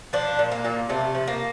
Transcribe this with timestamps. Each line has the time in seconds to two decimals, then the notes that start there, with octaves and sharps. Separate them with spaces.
0.13 F3 D4
0.39 A#2
0.51 A#3
0.65 A#2
0.89 C3 A3
1.15 F3
1.27 A#3